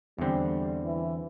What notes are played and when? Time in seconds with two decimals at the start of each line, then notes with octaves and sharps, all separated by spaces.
0.18 E2 D3 G3 C4
0.84 E3